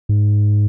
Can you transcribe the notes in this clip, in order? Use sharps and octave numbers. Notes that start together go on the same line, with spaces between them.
G#2